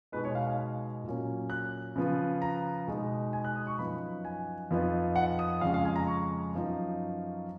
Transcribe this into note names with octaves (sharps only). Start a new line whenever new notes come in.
B2 G#3 D#4 B4
C#5
F5
F5
G#5
A#2 F#3 A#3 C#4
F#6
C#3 F3 B3
A#5
B2 G#3 B3 D#4
G#5
F#6
D#6
C#6
F#2 F3 B3 D#4 B5
G#5
F2 F3 B3 D#4
F#5
D#6
F2 C#3 G#3 F5
F5
G#5
A#5
C#6
F#2 F3 B3 D#4